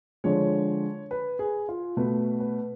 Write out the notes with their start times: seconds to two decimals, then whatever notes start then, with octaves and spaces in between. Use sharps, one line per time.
0.24 D3 F3 G#3 C#5
1.11 B4
1.39 G#4
1.68 F4
1.97 B2 A3 B4
2.40 B4